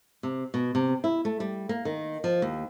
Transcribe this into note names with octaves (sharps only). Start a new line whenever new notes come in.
C3
B2
C3
E4
A3
G3
A#3
D#3
F3
D#2